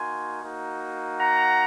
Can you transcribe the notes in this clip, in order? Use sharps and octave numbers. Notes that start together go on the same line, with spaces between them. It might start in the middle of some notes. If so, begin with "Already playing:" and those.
Already playing: A#3 D#4 F#4 G#5 C6
A#3 D#4 F#4
F#5 A#5